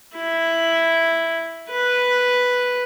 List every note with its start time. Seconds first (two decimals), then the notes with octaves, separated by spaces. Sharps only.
0.15 E4
1.70 B4